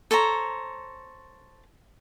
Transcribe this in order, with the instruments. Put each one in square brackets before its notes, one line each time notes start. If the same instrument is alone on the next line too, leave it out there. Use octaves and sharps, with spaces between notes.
[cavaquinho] A4 C5 C#5 A#5